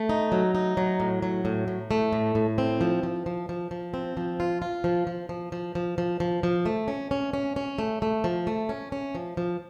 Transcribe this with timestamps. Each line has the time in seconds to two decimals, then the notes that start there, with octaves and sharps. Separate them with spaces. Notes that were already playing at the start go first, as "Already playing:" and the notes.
Already playing: A3
0.09 D#4
0.32 F#3
0.55 D#4
0.77 F#3
1.00 A2
1.22 F#3
1.45 A2
1.68 A2
1.91 A3
2.13 A2
2.35 A2
2.58 C4
2.81 F3
3.03 F3
3.26 F3
3.49 F3
3.71 F3
3.94 C4
4.17 F3
4.40 F4
4.62 F4
4.84 F3
5.07 F3
5.29 F3
5.52 F3
5.75 F3
5.98 F3
6.20 F3
6.43 F3
6.66 A3
6.88 C#4
7.11 C#4
7.33 C#4
7.56 C#4
7.79 A3
8.02 A3
8.24 F3
8.47 A3
8.69 C#4
8.92 C#4
9.15 F3
9.37 F3